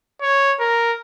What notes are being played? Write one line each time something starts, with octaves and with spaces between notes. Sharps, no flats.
C#5
A#4